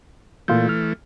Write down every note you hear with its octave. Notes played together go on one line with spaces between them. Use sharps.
A#2 E3 A3 F4 G6
F6